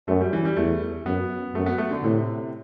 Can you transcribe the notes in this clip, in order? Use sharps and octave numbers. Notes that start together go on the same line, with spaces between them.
F#2 A3
G3
E3
G3
E2 A3
F#2 B3
F#2 A3
B3
A3
D3
A2 C3